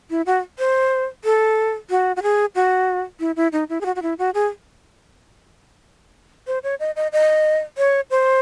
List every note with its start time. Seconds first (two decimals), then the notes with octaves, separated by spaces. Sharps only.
0.10 E4
0.26 F#4
0.59 C5
1.24 A4
1.90 F#4
2.16 F#4
2.23 G#4
2.55 F#4
3.20 E4
3.36 E4
3.52 D#4
3.69 E4
3.81 G#4
3.86 F#4
3.96 F#4
4.02 E4
4.19 F#4
4.34 G#4
6.47 C5
6.64 C#5
6.80 D#5
6.96 D#5
7.12 D#5
7.78 C#5
8.11 C5